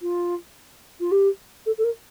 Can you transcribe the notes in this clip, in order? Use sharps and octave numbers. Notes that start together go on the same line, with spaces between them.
F4
F4
G4
A4
A4
A#4